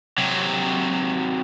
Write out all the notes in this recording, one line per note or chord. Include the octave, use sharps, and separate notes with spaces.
C3 F#3